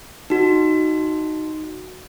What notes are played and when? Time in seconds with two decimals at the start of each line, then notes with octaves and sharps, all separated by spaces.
0.30 D#4 F#4